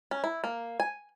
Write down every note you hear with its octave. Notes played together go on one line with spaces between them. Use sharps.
C#4
E4
A#3
G#5